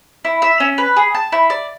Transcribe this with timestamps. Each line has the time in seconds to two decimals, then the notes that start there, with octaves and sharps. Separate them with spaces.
0.25 E4
0.42 E5
0.60 C#4
0.78 B4
0.96 G#4
1.15 A5
1.32 E4
1.50 D5